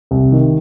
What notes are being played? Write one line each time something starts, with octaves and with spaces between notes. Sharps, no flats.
C2
D#3